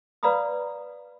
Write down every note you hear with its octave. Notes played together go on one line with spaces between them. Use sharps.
B4 D5 F5 A#5 B5 D#6